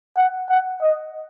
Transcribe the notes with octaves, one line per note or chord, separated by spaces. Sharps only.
F#5
F#5
D#5